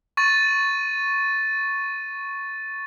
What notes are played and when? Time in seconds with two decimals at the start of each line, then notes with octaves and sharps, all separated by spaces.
0.17 C#6 A6 D#7